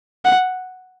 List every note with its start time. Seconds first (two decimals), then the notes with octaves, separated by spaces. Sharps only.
0.25 F#5